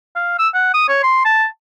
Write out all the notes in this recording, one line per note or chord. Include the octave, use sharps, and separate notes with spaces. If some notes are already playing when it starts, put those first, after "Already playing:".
F5
E6
F#5
D#6
C#5
C6
A5